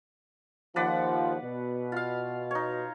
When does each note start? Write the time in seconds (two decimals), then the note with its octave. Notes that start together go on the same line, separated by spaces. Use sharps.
0.76 D#2 F3 B4 D5 F#5
1.44 B2
1.92 F4 F5
2.51 D#4 C#5